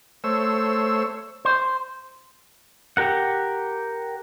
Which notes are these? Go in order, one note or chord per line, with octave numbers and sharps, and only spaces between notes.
A3 C5 C#5 E6
C5
G4 A#4 F#5